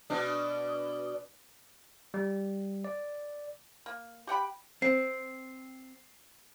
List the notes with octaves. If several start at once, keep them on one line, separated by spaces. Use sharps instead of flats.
B2 D4
G3
D5
A#3
G4 F#5 G5 B5
C4 C7